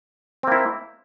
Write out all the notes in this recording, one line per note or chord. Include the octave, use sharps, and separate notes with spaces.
A#3 C4 E4